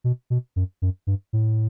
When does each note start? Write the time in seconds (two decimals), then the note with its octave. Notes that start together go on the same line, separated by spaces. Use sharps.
0.04 B2
0.30 B2
0.56 F#2
0.82 F#2
1.07 G2
1.33 A2